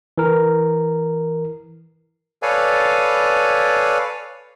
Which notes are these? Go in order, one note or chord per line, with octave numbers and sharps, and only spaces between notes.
E3 A#4
A4 B4 C#5 D5 F5 G#5